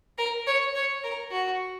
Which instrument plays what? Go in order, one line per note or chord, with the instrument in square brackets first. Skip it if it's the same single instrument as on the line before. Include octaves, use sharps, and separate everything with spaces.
[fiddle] A#4
C#5
C#5
A#4
F#4